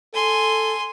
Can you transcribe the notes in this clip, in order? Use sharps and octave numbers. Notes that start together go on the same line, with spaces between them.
A4 G#5 C6